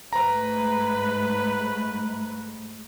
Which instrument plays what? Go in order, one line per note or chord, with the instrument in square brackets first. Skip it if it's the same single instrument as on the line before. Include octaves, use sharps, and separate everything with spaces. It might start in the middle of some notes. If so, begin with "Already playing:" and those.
[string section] G#2 A3 [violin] B4 [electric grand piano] A#5